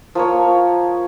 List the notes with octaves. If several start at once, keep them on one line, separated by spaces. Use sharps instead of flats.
F3 A#3 C#5